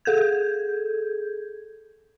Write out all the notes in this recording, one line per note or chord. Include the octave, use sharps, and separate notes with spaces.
G#4 A4 G6 G#6